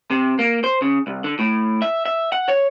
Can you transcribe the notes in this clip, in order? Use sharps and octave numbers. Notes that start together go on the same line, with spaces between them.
C3
A#3
C5
C#3
C2
D3
A2
E5
E5
F#5
C#5